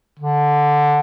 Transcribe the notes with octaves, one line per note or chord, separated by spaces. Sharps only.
D3